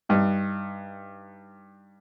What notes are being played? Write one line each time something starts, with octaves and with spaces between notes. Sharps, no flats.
G2 D#4